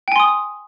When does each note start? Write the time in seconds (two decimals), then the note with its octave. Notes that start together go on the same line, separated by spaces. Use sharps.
0.08 G5
0.12 G#5
0.16 C6
0.20 D#6